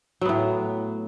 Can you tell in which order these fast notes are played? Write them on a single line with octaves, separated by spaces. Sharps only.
F#3 B3 A2